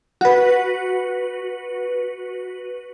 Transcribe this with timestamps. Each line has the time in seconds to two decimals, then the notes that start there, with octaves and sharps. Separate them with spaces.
0.21 F#4 B4